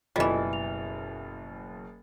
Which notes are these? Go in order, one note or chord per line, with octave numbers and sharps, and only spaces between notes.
F#1 B2 E3 G3 F4 A4 D#5
F7